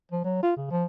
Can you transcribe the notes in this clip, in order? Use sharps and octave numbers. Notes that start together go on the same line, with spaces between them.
F3
F#3
F4
C#3
F3